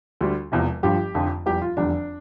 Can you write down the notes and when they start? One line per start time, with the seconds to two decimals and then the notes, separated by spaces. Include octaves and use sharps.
0.21 D2 D3 G3
0.52 E1 E2 C3 F3
0.83 G1 G2 F3 G4
1.14 F1 F2 D3 F3
1.46 F1 E2 E3 G3 G4
1.62 F4
1.77 F1 E2 D3 G3 D4